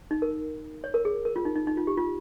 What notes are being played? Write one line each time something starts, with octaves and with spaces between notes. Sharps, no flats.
D#4
A#4
C#5
A#4
G#4
A#4
F4
D#4
D#4
D#4
F4
G4
F4